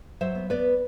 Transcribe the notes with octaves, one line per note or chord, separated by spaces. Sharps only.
F#3 C5 E5
B3
B3 B4 D5